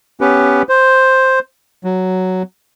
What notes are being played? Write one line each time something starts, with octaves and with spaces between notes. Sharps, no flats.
B3 C#4 G4 B4
C5
F#3